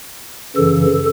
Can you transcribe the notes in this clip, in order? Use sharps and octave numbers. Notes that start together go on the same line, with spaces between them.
F#2 C#3 E3 A4